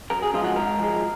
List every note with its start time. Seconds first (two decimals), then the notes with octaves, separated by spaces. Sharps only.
0.10 F#2 A#4
0.22 G#4
0.33 C#3 F3 G#3 F4
0.44 F#4
0.56 G#2 A#4
0.79 F3 G#3